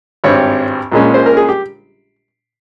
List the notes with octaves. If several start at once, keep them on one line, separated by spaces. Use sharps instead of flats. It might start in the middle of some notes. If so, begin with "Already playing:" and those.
G#1 G2 G3 C4 C#5
A#1 A#2 G#3 C#4
C5
A#4
G#4
G4